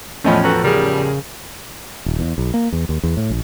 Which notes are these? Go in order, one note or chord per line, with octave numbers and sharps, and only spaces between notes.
E2 A2 F3 A3 C#4 D#5 B5
F#4 A4 B4 A#5
C#3 G3 G#4 A#4
D#1
E2
B1
A#3
E2
D#2
E2
A2
A#1